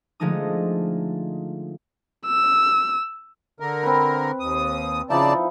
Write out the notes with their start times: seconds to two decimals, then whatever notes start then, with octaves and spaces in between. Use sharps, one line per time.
0.20 D3 F3 G#3 A3 D#4 D#6
2.27 E6
3.60 D3 A#4
3.83 C4 B4
4.40 D#2 D#6
5.10 C#3 F3 D#4 E4 D5 A5